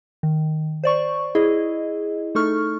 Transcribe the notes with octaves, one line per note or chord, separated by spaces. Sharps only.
D#3
C5 D5 C#6
E4 G#4 D#5
A3 D#4 A4 C#6 F6